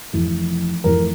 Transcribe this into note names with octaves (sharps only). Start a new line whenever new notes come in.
F1 F2 E3
F1 F2 E3 A#4